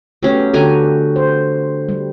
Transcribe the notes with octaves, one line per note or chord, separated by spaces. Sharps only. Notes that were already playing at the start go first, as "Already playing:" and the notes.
F#3 A3 B3 C#4 G4
D3 F#4 G4 G#5 A#5
C5
G3